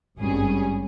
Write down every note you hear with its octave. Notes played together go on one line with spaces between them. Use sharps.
G#1 G2 G3 C#4 G#4